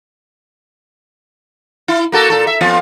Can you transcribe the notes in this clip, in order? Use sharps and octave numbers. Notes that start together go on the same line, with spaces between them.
E4
A#3 F#4 A4
A#2 A4
E5
F2 B3 F4